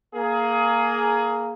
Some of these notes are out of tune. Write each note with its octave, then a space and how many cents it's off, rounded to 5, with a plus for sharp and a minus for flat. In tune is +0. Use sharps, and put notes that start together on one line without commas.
A#3 +0 G#4 +20